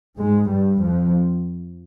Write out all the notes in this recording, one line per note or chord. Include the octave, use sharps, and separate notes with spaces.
G#2 G#3
G2 G3
F2 F3